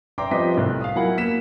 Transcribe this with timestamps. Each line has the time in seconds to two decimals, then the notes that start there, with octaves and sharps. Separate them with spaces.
0.18 D5 E5 G5 A#5 C6 D6
0.31 F3 G3 C4 B4 D#5 B6
0.56 C2 A2
0.81 F5 D#6
0.96 F#3 E4 A#4 F#5 G#5 B5
1.17 A#3 B6 E7